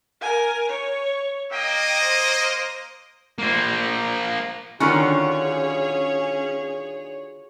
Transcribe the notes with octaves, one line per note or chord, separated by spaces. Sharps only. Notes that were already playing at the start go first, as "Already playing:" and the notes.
A#4 G#5
C#5
A#3 D#5 G5
C5
A#3 C5
D3 D#3 C#4 F4 F#4 G#4 C#5